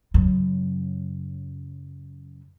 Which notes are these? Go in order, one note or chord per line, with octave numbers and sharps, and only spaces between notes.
F#2 C#3